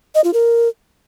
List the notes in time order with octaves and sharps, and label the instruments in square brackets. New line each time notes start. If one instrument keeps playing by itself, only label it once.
[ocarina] D#5
F4
A#4